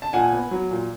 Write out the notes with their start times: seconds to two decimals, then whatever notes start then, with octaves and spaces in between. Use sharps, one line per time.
0.02 A5
0.13 A#2 F#5 G#5
0.33 B3
0.51 F#3
0.71 A#2